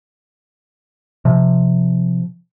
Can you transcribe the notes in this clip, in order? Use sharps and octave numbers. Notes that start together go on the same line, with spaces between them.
C3 F3